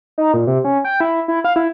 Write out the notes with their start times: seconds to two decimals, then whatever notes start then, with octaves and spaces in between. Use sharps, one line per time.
0.18 D#4
0.34 A#2
0.47 C3
0.65 C#4
0.85 G5
1.01 E4
1.28 E4
1.44 F5
1.56 E4